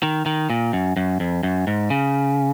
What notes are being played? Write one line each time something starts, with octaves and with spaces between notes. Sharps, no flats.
D#3
D#3
A#2
F#2
F#2
F2
F#2
G#2
C#3